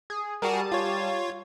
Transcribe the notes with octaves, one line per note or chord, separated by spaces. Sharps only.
G#4
G3 F#4 G#4 A#4 A5 D#7
F4 C#5